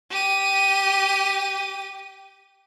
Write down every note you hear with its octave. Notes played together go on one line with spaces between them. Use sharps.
G4 D#7